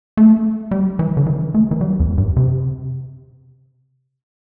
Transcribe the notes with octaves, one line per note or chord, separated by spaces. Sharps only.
A3
G3
E3
D3
E3
A3
E3
G3
E2
G2
C3